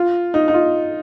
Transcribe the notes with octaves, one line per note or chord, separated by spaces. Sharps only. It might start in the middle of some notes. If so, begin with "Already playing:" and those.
Already playing: F4
D#4
D#4
F4